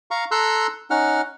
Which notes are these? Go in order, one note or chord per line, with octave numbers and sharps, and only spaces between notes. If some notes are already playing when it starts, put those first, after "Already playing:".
F5 A#5 C#6
A4 A#5 C6 E6 F#6
C#4 D#4 F#5 F6